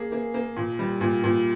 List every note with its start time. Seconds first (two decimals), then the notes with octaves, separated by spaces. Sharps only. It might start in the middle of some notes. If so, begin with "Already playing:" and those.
Already playing: A#3 G#4
0.12 A#3
0.34 A#3
0.57 A#2
0.79 G3
1.01 A#2
1.24 A#2